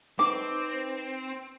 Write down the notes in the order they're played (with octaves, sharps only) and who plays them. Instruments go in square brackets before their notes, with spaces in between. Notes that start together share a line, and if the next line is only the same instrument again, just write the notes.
[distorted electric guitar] C4 [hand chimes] D#4 B4 [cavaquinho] D6